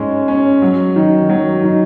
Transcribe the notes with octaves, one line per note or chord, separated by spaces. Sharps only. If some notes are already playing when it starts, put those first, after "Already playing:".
Already playing: G#2 G#3 C#4
C#4
F#3
D#3
F#3
D#3